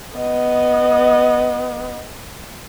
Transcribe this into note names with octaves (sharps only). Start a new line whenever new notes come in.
B3 D#5